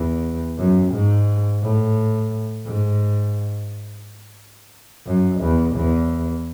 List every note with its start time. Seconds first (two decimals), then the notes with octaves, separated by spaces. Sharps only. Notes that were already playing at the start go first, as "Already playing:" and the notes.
Already playing: E2
0.58 F#2
0.93 G#2
1.62 A2
2.66 G#2
5.06 F#2
5.41 E2
5.76 E2